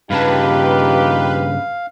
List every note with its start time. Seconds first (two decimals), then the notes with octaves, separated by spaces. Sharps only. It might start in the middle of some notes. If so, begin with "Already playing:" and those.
0.10 G2 C#3 D#4 F4 G4 B4 F5 A5